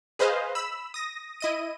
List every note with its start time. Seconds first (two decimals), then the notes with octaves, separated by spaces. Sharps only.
0.19 G#4 B4 C5 D#5 F5
0.55 B5 E6
0.94 D#6 A#6
1.41 E4 D#5 D#7